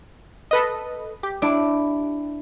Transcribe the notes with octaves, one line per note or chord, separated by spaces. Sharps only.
A4 B4 D#5
G4
D4 E4